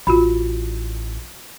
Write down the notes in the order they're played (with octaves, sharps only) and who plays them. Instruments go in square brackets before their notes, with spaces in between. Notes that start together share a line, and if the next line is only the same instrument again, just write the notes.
[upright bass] A1 [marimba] F4 F#4 B5